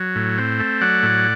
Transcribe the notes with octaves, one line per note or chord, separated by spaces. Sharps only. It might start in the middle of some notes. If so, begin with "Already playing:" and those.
Already playing: F#3
A2
C4
A3
F#3 D5 F#5
A2